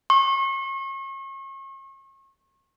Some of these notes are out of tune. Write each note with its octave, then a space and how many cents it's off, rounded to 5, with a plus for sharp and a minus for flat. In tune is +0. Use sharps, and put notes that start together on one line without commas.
C#6 -40